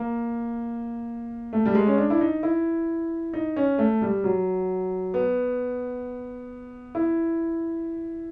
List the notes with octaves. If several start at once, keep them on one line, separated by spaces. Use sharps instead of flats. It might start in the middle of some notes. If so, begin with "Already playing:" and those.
Already playing: A#3
A3
G3
G#3
C#4
D4
E4
D#4
E4
D#4
C#4
A3
G3
F#3
B3
E4